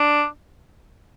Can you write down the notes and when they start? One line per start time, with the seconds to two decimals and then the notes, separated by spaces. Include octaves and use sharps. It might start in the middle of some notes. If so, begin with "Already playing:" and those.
Already playing: D4